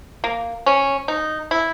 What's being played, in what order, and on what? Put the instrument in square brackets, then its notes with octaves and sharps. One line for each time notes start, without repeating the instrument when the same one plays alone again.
[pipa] A#3
C#4
D#4
E4